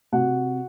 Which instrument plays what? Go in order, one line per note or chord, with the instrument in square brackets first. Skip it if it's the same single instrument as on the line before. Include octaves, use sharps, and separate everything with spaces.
[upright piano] C3 F#4 F#5